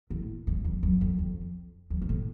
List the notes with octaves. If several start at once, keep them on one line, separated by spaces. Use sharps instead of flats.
A2
G#2
F2
F#2
F2
F2
F2
G#2
A2